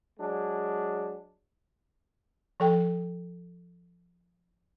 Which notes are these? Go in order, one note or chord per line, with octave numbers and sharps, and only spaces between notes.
F#3 G#3 D4
F3 A4 G5